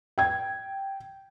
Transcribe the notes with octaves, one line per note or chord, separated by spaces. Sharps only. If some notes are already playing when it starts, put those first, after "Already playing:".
G5 G#6